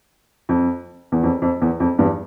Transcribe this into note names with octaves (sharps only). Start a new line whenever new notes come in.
F2
E2
F2
F2
E2
F2
E2 G2